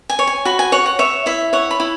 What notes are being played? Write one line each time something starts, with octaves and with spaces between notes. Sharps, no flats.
G#5
C#5
G#5
F#4 B5
G#5
C#5 F#5
F#5
C#5 E5
E4 E5
C#5 F#5
B5
E4